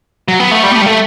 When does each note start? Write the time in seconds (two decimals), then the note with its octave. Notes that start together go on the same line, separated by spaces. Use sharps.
0.28 F#3
0.40 B3
0.51 A3
0.63 G3
0.71 B3
0.76 A3
0.82 G3
0.86 A3